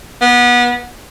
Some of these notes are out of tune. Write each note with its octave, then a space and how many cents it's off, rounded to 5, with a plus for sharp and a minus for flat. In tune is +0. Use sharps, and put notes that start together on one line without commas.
B3 -25